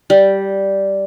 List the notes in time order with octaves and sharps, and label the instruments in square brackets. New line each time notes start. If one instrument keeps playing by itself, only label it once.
[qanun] G3